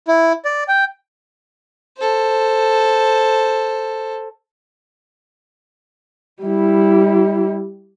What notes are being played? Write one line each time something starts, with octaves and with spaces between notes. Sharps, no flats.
E4
D5
G5
A4 C5
G3 E4